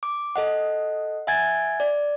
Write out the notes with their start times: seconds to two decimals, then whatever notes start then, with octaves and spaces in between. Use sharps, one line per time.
0.03 D6
0.36 A4 D#5 F#5
1.27 E5 F#5 G#5 G#6 A6
1.80 D5